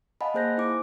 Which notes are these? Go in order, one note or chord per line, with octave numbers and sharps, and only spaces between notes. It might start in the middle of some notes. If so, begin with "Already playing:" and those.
D#5 F5 F#5 G#5 A5 B5
A#3 G#4 C5 F#6 G6 A#6
D#4 E4 C5 G#5 D6